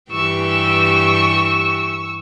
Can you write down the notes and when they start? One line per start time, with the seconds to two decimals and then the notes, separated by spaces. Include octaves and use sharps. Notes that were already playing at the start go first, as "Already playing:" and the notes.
0.12 G2 E3 G4 C#6 E6